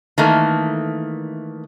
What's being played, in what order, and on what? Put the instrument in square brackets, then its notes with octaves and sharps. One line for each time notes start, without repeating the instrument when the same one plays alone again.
[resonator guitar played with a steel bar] D#3 E3 A3 A#3